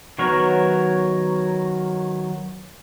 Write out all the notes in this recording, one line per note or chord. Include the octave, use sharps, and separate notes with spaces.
D#3 F#3 B3 A#4 C#5